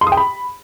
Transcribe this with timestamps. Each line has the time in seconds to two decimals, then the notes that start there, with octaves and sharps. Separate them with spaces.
0.01 C6
0.07 D#6
0.12 G5
0.17 B5